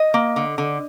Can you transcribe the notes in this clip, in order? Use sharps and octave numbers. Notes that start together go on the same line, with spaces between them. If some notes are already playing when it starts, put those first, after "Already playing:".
Already playing: D#5
A#3
D3
D3